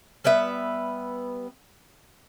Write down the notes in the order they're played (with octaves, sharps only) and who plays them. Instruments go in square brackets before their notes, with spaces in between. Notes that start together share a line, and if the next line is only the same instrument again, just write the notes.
[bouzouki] G3 B3 B4 E5